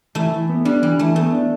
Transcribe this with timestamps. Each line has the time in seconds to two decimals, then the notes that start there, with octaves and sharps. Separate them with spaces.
0.15 E3 A3
0.32 E3
0.49 B3
0.65 G3 D4
0.82 E3 G3
0.99 E3 A3
1.15 A3 B3
1.32 D4